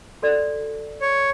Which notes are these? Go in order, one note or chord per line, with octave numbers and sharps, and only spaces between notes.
F#4 A4 D5
C#5